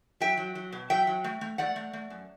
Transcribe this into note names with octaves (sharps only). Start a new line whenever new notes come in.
F#3 E5 G5
F#3
F#3
B2
F#3 E5 G5
F#3
A3
A3
A3 D5 F#5
A3
A3
F#2